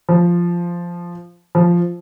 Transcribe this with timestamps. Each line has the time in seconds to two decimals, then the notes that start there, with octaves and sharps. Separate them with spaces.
0.09 F3
1.55 F3